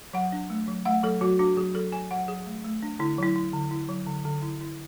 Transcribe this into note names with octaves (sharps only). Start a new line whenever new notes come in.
F#3 F#5
D4
A3
F#3
A3 F#5
F#3 A4
F#3 F#4
D4 F#4
F#3 G#4
F#3 A4
F#3 G#5
F#3 F#5
F#3 G#4
A3
A3
D4
D3 E4
F#3 E4
E4
D3
E4
F#3
D3
D3
E4
E4